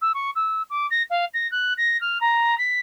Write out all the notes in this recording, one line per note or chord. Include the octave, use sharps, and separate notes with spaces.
E6
C#6
E6
D6
A#6
F5
A#6
F#6
A#6
F6
A#5
B6